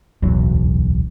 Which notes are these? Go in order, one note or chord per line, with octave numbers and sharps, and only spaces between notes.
D1 B1 E2 F#3